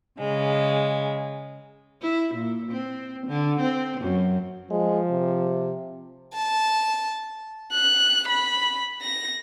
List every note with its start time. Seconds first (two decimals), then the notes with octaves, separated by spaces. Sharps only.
0.19 C#3 G#3
2.02 E4
2.35 A#2
2.72 C4
3.27 D3
3.60 C4
4.01 F#2
4.71 F3 G#3
5.10 C3
6.35 A5
7.73 F#6
8.28 B5
9.02 A#6